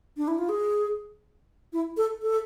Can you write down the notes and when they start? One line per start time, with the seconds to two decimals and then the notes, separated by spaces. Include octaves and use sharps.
0.17 D4
0.28 E4
0.39 F4
0.49 G#4
1.73 E4
1.97 A4
2.22 A4